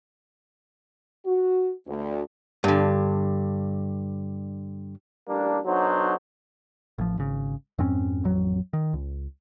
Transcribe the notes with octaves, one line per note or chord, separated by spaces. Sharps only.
F#4
D2
G2 D3
A1 G3 A#3 D4
B1 F#3 D4 D#4 F#4 C5
A1 F3
G#1 C#3
F2 G#2 C4 C#4
A1 F2 F#3
D#3
C#2